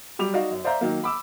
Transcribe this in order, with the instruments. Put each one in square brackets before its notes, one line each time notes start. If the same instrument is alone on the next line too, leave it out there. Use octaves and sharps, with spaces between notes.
[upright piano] F#3 G3 D6 F7
D#4 F#4 D5 D#5 F5
F#2
C5 D5 E5 F5 A#5 G6
D#3 F#3 A#3
B5 D6 E6